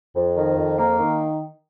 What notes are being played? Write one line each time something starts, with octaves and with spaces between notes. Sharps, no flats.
F2
D#3
F2
A#3
D#3